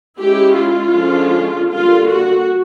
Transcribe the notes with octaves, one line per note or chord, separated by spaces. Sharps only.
G#3 C#4 E4 G4
F4
D3 F3 G#3 C#4
D3 G3 A#3 F4
F#4